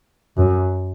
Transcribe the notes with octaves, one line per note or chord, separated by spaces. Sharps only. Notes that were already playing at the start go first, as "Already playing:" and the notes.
F#2